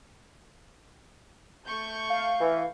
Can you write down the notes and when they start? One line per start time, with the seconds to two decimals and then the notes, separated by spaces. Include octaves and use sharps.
1.67 A3 C#6 G6
2.10 F5
2.41 E3